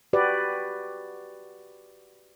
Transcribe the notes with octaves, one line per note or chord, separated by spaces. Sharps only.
F#4 G4 B4 D5